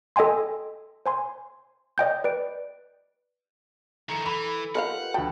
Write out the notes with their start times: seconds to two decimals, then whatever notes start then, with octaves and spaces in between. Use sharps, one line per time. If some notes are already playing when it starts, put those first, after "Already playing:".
0.16 A4 D#5 G5 G#5 C6
1.06 C5 G#5 C6
1.98 D5 D#5 G5 G6
2.24 B4 D5 D7
4.09 D#3 E4 A4 A#5 C#7
4.25 E3 B5
4.75 F4 G4 A#4 B4 D#5 F5 F#5
5.14 D2 F#4 F#5 G5 A5 B5 D#6